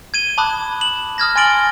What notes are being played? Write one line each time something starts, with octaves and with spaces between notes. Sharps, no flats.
G#6 D#7 G7
A5 B5 D6 D#6 F#6
E7 F#7
D#6 F6 G#6 A#6
G#5 C6 A6 D7 F#7 G7